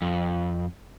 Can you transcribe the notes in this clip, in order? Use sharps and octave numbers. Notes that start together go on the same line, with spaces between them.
F2